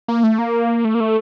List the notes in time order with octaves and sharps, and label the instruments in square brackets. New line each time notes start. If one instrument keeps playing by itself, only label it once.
[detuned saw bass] A#3
A3
A#3
A3
A#3
A3